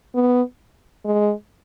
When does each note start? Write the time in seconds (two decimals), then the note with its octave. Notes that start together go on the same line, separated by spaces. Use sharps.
0.15 B3
1.05 G#3